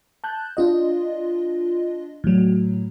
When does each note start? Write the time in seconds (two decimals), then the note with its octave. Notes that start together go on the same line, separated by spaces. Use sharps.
0.24 A5 F#6 G6
0.57 D4 F4 D#5
2.24 A2 F#3